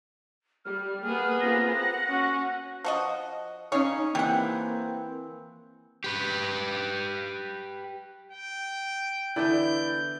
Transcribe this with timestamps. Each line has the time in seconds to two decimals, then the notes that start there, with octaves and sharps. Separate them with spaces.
0.65 G3 F6
1.05 A#3 B3 G#4
1.40 A#3 C4 F4 A#6
1.74 F#5
2.09 C#4 F#4
2.84 F3 F#4 D#5
3.72 C#3 C#4 D#4 G#4 C#5
4.15 E3 A#3 C4 G4 F#5
6.04 G4 B4
8.32 G5
9.36 D3 E3 B3 E4 D5 G6